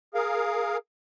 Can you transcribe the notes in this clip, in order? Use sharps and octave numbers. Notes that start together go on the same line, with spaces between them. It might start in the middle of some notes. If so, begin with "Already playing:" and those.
G#4 A#4 F5